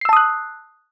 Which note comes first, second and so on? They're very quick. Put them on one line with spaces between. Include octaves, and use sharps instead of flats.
C7 E6 A5 D#6 F#6